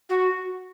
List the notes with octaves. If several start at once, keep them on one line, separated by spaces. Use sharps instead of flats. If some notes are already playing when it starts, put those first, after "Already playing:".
F#4